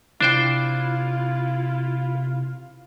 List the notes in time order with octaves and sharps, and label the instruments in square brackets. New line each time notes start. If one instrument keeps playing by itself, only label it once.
[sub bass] C3 [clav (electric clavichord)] D4 C5 G5 [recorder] E4 [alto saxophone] F4